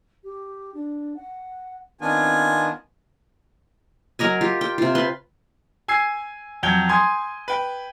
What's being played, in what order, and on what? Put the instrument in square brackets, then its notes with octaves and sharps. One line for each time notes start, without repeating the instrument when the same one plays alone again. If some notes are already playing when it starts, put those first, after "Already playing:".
[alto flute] G4
D4
F#5
[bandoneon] D#3 B3 D4 [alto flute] C4 [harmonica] F4 G#5
[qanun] F#3 A#4 D#5 G#5
F4 G4
G5
C3 F4
B4 C6
[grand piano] G#5 E6 G#6 C7
F2 F#3 G5 G6 G#6 G7
G#5 C6 D#6 G#6
B4 G5